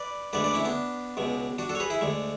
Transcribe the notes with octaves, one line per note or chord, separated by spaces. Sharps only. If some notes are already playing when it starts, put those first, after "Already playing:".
Already playing: B4 D5
D2 D3 G#3 B4 D5
B4 D5
C#4 E4
B3 D4
C#2 B2 G#3
D4 F#4
F#4 A4
C#5
G#4 B4
E4 G#4
D2 D3 G#3